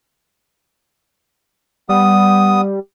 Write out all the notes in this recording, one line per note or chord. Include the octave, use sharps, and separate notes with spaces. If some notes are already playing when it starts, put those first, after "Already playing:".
G3 B3 D#6